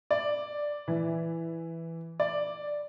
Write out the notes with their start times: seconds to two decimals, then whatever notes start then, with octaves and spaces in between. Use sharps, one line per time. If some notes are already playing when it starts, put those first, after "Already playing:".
0.11 D5
0.88 E3
2.20 D5